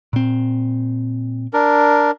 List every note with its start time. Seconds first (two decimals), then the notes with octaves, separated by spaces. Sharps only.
0.13 A#2 C4
1.53 D4 A#4